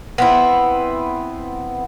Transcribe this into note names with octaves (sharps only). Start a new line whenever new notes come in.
B3 C4 E4